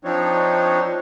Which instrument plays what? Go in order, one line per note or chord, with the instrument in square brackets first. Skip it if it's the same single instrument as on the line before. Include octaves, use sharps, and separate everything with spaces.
[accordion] F3 C4 D4 D#4 C#5